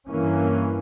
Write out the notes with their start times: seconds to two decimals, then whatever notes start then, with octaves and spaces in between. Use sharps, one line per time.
0.09 G2 E3 A#3 C#4